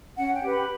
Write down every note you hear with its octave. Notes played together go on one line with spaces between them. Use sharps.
C#4 F#5
G5
G4 B4
B5